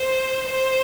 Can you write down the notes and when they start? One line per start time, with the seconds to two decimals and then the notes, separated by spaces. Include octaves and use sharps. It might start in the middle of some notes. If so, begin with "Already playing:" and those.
Already playing: C5
0.50 C5